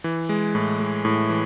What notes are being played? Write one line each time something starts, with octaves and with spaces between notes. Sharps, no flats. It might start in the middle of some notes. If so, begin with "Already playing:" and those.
E3
G#3
A2
G#3
A2
E3